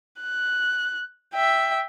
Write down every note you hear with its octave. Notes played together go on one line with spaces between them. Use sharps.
F#6
E5 G5